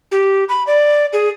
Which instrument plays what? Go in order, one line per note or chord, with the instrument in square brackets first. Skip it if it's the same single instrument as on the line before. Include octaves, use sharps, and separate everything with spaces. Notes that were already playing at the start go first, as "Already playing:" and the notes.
[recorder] G4
B5
D5
G#4